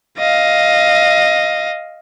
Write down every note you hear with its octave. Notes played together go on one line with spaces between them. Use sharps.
D#5 F5